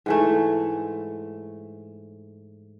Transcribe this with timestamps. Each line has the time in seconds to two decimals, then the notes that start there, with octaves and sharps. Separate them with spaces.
0.06 G#2 E3 A3